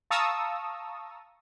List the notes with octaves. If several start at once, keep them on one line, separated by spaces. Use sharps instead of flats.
F5 A5 A#5 C#6 D#6 E6